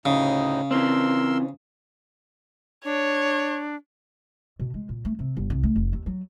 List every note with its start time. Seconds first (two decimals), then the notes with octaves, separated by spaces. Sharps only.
0.06 D2 A2 C#3 D#4
0.71 E3 C4 A#4 C6 E6
2.85 D4 C#5
4.59 B2
4.74 G#3
4.89 A#2
5.05 A3
5.19 C3
5.37 G1
5.50 C2
5.63 A3
5.76 F1
5.93 D#2
6.06 F#3